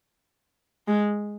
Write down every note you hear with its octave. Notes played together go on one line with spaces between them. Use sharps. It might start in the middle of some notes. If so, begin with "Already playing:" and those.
G#3